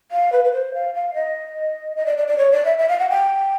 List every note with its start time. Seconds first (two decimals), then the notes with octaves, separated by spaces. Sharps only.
0.11 F5
0.32 B4
0.44 B4
0.52 C5
0.74 F5
0.94 F5
1.14 D#5
1.96 D#5
2.06 D5
2.17 D5
2.27 D5
2.38 C#5
2.51 D5
2.65 E5
2.78 E5
2.88 F5
2.99 F#5
3.09 G5